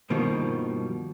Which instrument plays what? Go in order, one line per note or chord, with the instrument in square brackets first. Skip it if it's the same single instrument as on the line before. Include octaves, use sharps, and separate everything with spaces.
[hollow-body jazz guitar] G2 B2 D#3 F3 G3 A#3